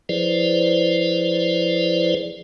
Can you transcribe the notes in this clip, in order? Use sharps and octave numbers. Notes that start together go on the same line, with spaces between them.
F3 E4 G#4 B4 C5 D5